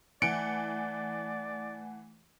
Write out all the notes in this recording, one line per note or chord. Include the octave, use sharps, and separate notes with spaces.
E3 A3 D5 F#5 G#5 C#7 D7